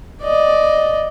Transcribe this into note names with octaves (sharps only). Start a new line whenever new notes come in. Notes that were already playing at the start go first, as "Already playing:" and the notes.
D5 D#5